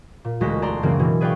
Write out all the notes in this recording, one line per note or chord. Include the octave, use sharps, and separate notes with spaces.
A#2
E1 D2 G#3 F#4 A#6 B6
D5 A5 A#5 C6
F#2 C#3 E3 A#3 C4 D4
B2 E3
G#4 B4 D5 F5 G5 C#6